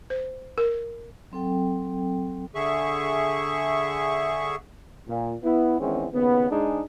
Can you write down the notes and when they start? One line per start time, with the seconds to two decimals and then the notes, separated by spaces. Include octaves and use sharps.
0.10 C5
0.58 A#4
1.32 F#3 C4 A4 G5
2.55 D3 G#4 E5 C#6
5.09 A#2
5.43 B3 E4
5.80 E2 D#3 G#3 C4 C#4
6.13 D#2 C#3 B3
6.50 G#2 G#3 D4 D#4 G#4